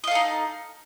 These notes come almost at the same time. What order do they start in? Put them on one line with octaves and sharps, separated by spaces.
D#5 F5 A4 D#4